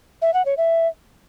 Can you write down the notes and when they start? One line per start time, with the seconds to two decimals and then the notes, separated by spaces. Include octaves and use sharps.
0.22 E5
0.34 F#5
0.45 C#5
0.57 E5